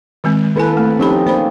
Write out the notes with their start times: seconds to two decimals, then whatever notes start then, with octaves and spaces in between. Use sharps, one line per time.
0.24 D#3 G#3 C4
0.56 D#3 A#3 E4 A4 B4 G#5
0.77 A3 C4
0.99 F3 C4 C#4 D#4 G4 B5
1.27 A#3 C5 D5 B5